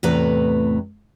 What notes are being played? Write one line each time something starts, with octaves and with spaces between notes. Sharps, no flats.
E2 A2 C3 A3 B4 A#5